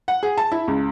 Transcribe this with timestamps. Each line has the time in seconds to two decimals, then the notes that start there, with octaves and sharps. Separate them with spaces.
0.08 F#5
0.23 G#4
0.38 A5
0.52 E4
0.68 C#2